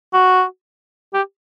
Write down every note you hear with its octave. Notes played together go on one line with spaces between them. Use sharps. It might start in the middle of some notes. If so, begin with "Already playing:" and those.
F#4
G4